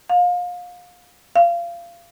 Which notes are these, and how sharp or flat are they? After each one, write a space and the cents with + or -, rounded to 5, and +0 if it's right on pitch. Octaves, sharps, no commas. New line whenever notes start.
F5 +30
F5 -25